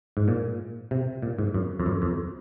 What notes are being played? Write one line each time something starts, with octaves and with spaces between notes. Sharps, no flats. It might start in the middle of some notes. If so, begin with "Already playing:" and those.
G#2
A#2
C3
A#2
G#2
F#2
F2
F#2
F2